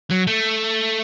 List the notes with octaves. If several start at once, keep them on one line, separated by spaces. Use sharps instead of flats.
F#3
A3